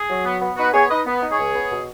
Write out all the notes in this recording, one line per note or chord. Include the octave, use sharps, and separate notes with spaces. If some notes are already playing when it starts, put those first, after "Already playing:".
Already playing: G#4
F#3
B3
B3
D#4 F#4 B4
B3 G#4 C#5
D#4 B4 D#5
B3
D#4
G#4 C#5
C#2
B3
B2